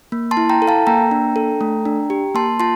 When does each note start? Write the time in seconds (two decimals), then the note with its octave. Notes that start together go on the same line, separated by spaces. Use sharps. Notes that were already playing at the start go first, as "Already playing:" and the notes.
0.12 A#3
0.31 A5 C6
0.37 E4
0.49 G5 A#5
0.62 A4
0.68 F5 A5
0.87 A#3 G5 A#5
1.11 D4
1.36 A4
1.61 A3
1.85 D4
2.10 G4
2.35 A#3 A5 C6
2.60 F4 A5 C6